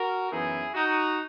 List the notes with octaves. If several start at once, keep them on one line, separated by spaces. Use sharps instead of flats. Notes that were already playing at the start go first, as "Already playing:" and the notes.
Already playing: F#4 A#4
F#2 E3 B3 D#4 E4 G#4
D#4 F#4